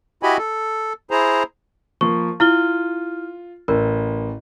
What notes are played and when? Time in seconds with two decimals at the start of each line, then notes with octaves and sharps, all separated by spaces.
0.23 E4 F#4 G4 D#5 G#5 B5
0.38 A4
1.11 E4 G#4 C5 A#5
2.01 F3 A#3 C#6
2.40 E4 F4 F6 G7
3.68 A1 A#4